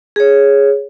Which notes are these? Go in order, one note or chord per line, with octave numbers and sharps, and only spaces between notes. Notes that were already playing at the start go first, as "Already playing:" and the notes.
G#4 C#5